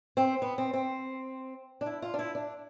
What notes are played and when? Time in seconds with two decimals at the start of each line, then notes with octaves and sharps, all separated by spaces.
0.17 C4
0.42 B3
0.58 C4
0.73 C4
1.81 D4
1.86 E4
2.02 F4
2.14 D4
2.19 E4
2.35 D4